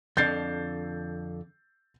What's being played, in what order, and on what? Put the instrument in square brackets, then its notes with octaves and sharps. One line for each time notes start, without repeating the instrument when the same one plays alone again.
[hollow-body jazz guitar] F2 D3 [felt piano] G6 A6 C7